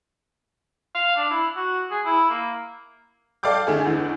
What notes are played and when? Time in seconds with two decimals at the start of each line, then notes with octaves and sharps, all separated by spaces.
0.95 F5
1.16 D4
1.30 E4
1.57 F#4
1.91 G#4
2.05 E4
2.30 A#3
3.43 A4 D5 F5 G5 D6 G6
3.67 D3 A3 G#4
3.85 A1 E2 D3